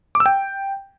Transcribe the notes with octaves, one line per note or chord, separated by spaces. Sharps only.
D6
E6
G5